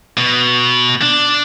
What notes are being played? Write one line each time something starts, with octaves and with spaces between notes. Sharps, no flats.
B2
D4